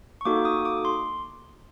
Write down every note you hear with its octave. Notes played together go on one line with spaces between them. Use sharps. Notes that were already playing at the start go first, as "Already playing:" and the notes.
C#6
A#3 D#4 F#4 A4 D6
D#6
D6
C6